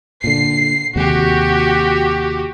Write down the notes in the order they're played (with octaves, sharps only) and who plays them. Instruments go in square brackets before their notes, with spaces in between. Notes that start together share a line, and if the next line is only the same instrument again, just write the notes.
[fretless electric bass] A#2 D3 [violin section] C7
[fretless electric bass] D#2 C3 G#3 [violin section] F#4 G4